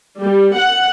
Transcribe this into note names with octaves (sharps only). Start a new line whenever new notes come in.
G3
F#5